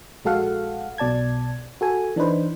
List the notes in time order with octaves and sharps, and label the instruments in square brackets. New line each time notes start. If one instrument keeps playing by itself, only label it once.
[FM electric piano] A#1 G#3 F#4 A4 F5 F#5
B1 B2 D5 A5 G#6
F#4 A4 G#5
E3 D4 D#4 B4 C5